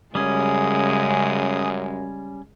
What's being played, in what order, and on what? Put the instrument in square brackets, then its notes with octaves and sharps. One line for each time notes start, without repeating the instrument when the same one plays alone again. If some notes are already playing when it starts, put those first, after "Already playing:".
[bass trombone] F#2 [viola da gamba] C#3 G#3 [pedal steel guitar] G3 C#4 [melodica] G#4 D#6